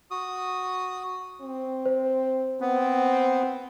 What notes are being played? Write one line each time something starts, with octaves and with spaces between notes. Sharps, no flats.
F#4 D#6
C4
C5
B3 C4